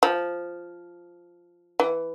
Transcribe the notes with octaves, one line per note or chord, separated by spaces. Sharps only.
F3
E3